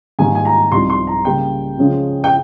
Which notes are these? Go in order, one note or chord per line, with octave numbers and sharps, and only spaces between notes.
G#2 D#3 G3 A#3 G#5
G#5
A#5
C2 C3 F3 C4 D#4 C6
C6
A#5
C#3 G3 A#3 G5
C#3 F3 G#3 C#4 F4
G5